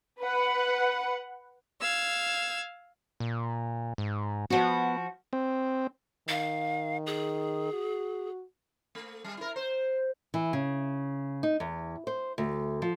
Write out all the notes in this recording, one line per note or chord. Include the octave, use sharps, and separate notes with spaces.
B4 F#5
F5 E6 G#6
A#2
G#2
F3 B3 F#4
C4
D#3 F5
G#4
F#4
A3
G3
E4 A#4
C5
E3
C#3
D#4
E2
C5
D2
F3